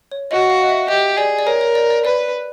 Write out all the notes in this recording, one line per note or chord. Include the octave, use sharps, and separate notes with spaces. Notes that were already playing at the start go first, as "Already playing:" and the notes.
C#5
F#4 D#5
F5
D#5
E5
G4 D#5
G#4 D5
D5
A#4 C#5
C#5
D5
D5
B4 D5